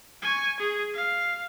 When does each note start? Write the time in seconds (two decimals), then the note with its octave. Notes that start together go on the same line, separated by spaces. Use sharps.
0.22 G#5 C#6
0.60 G#4
0.94 F5